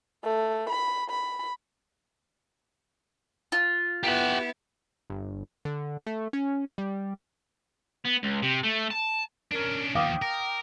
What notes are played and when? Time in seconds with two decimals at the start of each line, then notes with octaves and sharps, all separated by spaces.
0.24 A3
0.70 B5
1.10 B5
3.52 F4
4.03 B3 E4 G4 F#5
5.10 G1
5.65 D3
6.06 A3
6.33 C#4
6.78 G3
8.05 B3
8.23 C#2
8.43 C3
8.63 A3
8.90 A5
9.52 C#4 D4 A#4
9.95 D#2 F3 F5 G5 D6 D#6
10.22 A#4